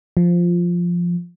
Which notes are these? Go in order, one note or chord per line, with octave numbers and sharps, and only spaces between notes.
F3